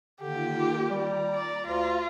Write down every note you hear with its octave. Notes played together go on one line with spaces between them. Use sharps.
D3 D#3 A#3 F4 G4
G3 A#5
D5
D2 F4